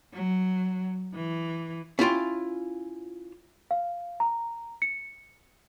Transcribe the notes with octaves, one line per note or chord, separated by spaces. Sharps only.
F#3
E3
C#4 E4 F4 G5
F5
A#5
C#7